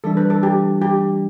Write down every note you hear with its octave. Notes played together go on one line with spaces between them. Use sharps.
E3 G3 D4 A4
B4
A4
G4
G4